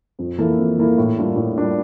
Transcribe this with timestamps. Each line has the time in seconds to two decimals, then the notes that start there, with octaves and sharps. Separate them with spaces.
0.19 F2
0.38 E3 A#3 E4 A4
0.58 F2
0.77 E3 A#3 E4 A4
0.98 A2
1.16 G3 D4 F4 A#4
1.36 A2
1.57 G3 D4 F4 A#4